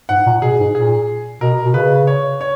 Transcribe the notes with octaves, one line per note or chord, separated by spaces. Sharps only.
G#2 F#5
A#2
B2 G#4
A#2
G#2
A#2 G#4
B2 A#4
B2
C#3 B4
C#5
C#5